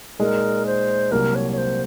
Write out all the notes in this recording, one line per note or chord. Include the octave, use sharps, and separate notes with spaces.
A#2 G#3 D#4 A#4
C5
C2 C3 F#3 A#3 A#4
C#5
C#5
C5